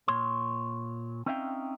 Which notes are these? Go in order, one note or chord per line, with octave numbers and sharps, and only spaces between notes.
A#2 C#5 C6
C4 C#4 D#4 E5 F5 G5